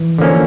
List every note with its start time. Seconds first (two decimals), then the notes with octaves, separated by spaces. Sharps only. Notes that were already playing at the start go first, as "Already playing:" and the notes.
Already playing: E3
0.18 D3 F3 A#3 C#4